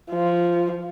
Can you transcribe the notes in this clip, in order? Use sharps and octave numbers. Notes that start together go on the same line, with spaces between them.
F3